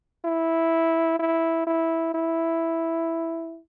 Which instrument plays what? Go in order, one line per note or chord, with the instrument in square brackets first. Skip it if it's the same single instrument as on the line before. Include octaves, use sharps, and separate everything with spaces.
[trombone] E4
E4
E4
E4